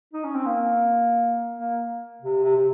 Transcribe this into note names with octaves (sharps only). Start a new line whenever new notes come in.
D#4
C#4
C4
A#3
A#3
C3
C3
C3